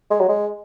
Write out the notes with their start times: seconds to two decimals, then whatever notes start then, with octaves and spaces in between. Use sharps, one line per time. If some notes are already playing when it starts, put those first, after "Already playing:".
0.11 G#3
0.20 F#3
0.29 G#3